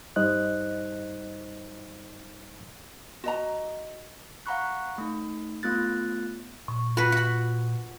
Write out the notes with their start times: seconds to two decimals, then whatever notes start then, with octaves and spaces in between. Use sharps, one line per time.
0.16 G2 G3 D#4 C5 D#5 F#6
3.24 F#4 D#5 A#5
4.46 F5 F#5 A#5 B5 C#6 F#6
4.98 A3 D#4
5.63 A3 B3 F4 F#6 A6
6.68 A#2 C#6
6.97 F4 F#4 B4
7.12 F#4 B5